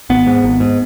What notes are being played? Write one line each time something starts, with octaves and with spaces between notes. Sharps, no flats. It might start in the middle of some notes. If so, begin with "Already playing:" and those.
G#1 B3
G#2
G#1
G#2